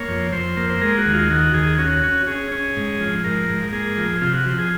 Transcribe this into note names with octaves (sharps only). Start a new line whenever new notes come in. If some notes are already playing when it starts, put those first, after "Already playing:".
Already playing: A#3 C#5
F2
F2 C5
A#3
C5
G#3 A#4
F#4
D#2
F4
D#3 F#4
D#2 G#4
C#4 F#4
C#4
C#4 G#4
C#4
G#2
F3
G#2 A#4
G#2
A#3 G#4
F3
C3 F4
F#4
F3
G#4